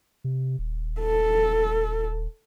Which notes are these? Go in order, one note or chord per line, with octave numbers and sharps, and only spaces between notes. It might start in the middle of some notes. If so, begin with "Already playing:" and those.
C3
D#1
A4